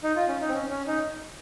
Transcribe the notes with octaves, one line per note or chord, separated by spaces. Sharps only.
D#4
F4
C#4
D#4
C4
C#4
C#4
D#4